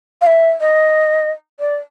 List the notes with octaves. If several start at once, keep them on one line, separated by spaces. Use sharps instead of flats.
F5
E5
D#5
D5